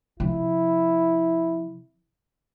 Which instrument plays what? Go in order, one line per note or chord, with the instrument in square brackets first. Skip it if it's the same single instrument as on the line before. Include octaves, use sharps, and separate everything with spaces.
[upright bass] C3 F3 [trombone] E4